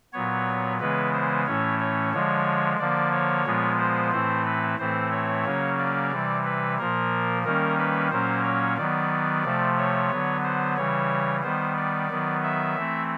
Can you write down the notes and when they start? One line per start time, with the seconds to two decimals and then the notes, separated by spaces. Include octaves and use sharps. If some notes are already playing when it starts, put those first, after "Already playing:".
0.13 A#2 F#3 B3 C#5
0.80 C#3 E3 G#3 B3 B4
1.13 C5
1.46 A2 E3 A3 C#4 C#5
1.79 C#5
2.13 D3 F3 G#3 C#5
2.79 D3 F3 A#3 D5
3.12 C#5
3.45 A#2 F3 G#3 B3
3.79 C5
4.12 A2 E3 A3 C4 C5
4.46 B4
4.79 A2 E3 A3 C4 C5
5.12 C#5
5.45 C#3 F#3 A#3 C#4
5.78 D5
6.12 C3 E3 G3
6.44 B4
6.78 A#2 F3 A#3 A#4
7.44 D#3 G3 A#3 C#4 A#4
7.78 B4
8.11 A#2 F#3 A#3 C#4 C5
8.44 C#5
8.77 D#3 F#3 B3 D5
9.44 C3 F3 A3
9.77 C#5
10.10 D3 F#3 B3
10.44 C5
10.77 C#3 E3 G3 C#5
11.43 D#3 G3 B3 C5
11.77 D5
12.10 D#3 F#3 B3
12.43 E5
12.76 E3 A3 C4